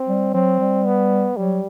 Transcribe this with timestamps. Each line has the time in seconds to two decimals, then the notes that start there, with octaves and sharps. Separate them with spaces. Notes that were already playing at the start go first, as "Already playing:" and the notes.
Already playing: C4
0.08 G3
0.34 F#3 C4
0.60 G3
0.86 B3
1.37 F#3 G3